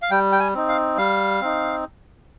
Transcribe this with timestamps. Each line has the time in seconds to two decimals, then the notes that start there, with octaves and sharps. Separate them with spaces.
0.02 F5
0.11 G3 G5
0.32 G5
0.39 G#5
0.54 C4 D#4
0.68 F5
0.97 G3 F5
1.41 C4 D#4